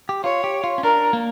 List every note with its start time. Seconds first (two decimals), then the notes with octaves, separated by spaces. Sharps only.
0.09 G4
0.24 F4 C#5
0.44 G4
0.64 F4
0.78 C#4
0.83 D4 A#4
1.13 A#3